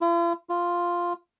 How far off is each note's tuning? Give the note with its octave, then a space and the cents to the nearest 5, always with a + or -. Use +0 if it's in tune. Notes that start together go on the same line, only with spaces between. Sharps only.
F4 -45
F4 +0